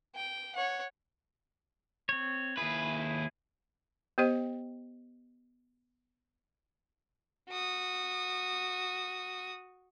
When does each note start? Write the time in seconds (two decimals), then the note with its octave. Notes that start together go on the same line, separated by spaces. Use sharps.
0.15 G5
0.55 C#5 F#5
2.09 C4 C#5
2.57 D#2 E4 G#4 B4
4.18 B3 G4 C5 D#5 G5
7.49 F#4 D#6